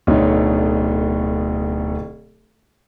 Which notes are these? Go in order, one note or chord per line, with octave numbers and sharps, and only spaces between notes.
D1 B2 D3 A3 D#4 C#5